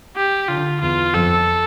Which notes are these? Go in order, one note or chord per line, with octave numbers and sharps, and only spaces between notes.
G4
D3 F4
E2 F4
F2 A4